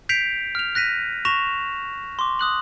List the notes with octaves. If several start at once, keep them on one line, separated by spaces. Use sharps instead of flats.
G6 B6 C7 D7 F7
F6 F7
F#6 A#6 B6 D#7
C#6 A#6 E7 F7
C6 D6
D#6 F#6 F#7